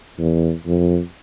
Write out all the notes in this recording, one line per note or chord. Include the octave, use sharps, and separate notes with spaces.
E2
F2